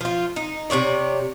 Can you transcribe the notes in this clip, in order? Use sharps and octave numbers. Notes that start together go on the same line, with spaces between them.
F3 F4
D#4
C3 E3 C#5 D5